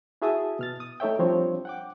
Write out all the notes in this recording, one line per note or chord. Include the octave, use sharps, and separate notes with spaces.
E4 F#4 G#4 E5 A5 D#6
B2 F6 A6
D#6
A3 D#4 A4 C#5 E5 G5
F3 G3 C4 D4 C#5
F#5 G5 D6